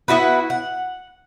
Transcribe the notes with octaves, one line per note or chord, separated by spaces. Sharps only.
B3 E4 F#4 B4
F#5